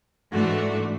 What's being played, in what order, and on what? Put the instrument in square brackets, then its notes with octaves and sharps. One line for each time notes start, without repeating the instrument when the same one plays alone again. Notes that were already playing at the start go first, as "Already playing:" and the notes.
[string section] G#2 E3 A3 D4 F#4